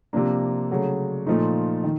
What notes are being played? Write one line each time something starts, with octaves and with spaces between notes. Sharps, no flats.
C3 F3 A#3 D4
C#3 F#3 A3
A#2 F3 A3 D#4
D#3